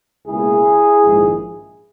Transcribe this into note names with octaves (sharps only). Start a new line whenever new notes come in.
C#2 B2 A#3 E4 G#4
A#1 G#2 D#3 G#3